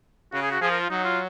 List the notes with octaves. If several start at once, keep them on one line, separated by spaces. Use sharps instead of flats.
C#3 F#4
G#4
F#4
F3 G#4
A#4
F4
F#3 D#4
F4